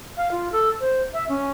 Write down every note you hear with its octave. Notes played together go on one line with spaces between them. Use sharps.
F5
F4
A4
C5
E5
C#4